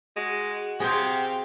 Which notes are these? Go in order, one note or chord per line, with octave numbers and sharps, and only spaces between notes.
G#3 F#4
C3 G#4 C5 F5 G5